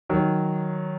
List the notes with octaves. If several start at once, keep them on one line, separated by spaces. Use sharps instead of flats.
D#3 F#3